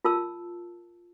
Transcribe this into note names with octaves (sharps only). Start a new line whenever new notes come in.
F4 A#4 A5 E6